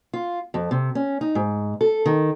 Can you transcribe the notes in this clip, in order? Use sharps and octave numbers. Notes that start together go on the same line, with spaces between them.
F4
F2
C3
C#4
D#4
G#2
A4
D#3